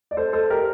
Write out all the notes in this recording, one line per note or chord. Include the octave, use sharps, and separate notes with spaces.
D5
A4 C5
A4 C5
G4 A#4